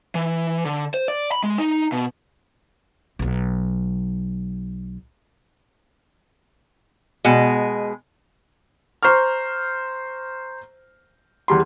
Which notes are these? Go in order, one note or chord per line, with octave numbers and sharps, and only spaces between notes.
E3
D3
C5
D5
B5
G#3
D#4
B2
B1 F#3
B2 G#3
C5 A#5 C#6 F6
E2 G3 C6